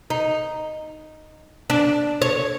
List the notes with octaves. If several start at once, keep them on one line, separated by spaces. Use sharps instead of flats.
D#4
D4
C#5